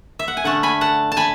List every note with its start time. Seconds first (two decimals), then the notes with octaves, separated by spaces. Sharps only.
0.19 E5
0.28 F#5
0.37 G#5
0.44 D3 A3 C#4 F#5 A5
0.63 G#5 B5
0.81 F#5 A5
1.12 A5
1.17 G#5 B5